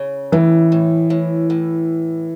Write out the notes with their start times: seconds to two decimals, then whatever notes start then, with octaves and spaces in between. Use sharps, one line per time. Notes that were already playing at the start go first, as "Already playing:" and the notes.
Already playing: C#3
0.32 A2 E3
0.72 A2
1.10 A2
1.50 A2